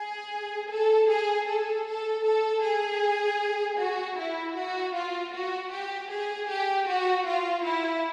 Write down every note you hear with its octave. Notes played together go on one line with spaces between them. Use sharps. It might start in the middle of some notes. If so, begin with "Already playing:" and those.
Already playing: G#4
A4
G#4
A4
A4
A4
G#4
F#4
E4
F#4
F4
F#4
G4
G#4
G4
F#4
F4
E4